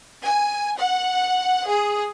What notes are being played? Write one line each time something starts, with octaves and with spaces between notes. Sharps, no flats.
G#5
F#5
G#4